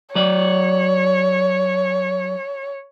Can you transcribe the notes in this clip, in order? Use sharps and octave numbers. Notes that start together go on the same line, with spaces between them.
F#3 C#5 D5